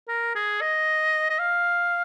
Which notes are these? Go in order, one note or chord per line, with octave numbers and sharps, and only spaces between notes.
A#4
G#4
D#5
D#5
F5